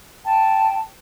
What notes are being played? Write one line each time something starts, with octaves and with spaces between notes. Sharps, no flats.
G5 A5